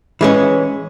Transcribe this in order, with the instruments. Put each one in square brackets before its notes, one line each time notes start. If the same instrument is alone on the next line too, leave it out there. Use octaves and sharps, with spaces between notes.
[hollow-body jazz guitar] E3 G#3 C#4